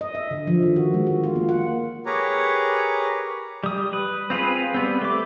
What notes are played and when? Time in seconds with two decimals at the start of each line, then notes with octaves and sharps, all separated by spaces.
0.01 D#5
0.15 E5
0.31 D3
0.47 F3
0.63 D#3
0.76 F#4
0.94 G#3
1.07 F#4
1.24 F4
1.36 A#3
1.49 F#5
2.06 G4 G#4 A#4 B4 C#5 A#5
3.64 G3 D#6
3.93 B4
4.30 C4 F4 G#4 B4
4.74 G3 B3 C4
5.02 A3 D6